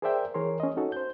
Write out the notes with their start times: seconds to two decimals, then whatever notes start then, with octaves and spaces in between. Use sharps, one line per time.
0.02 G#4 A#4 C5 D5 E5 G5
0.34 E3 G#4 A#4 C#5 C6
0.60 C#4 D#5
0.77 C#4 D#4 F#4 A4
0.92 C5 G6